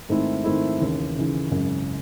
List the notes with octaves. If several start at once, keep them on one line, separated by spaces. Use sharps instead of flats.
G#2 D#3 A3 C4 E4
G#2 D#3 A3 C4 E4
D#2 C#3 E3
D#2 C#3 E3
G#1 F#2 C#3 G#3